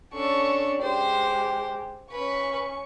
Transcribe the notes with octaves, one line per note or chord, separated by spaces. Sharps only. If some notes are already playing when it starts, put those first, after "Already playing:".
C#4 D4 A4 C#6
G#3 G4 C5
C#4 B4 C#6